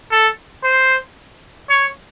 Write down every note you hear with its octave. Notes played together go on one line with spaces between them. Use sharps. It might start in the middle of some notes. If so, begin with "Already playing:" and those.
A4
C5
C#5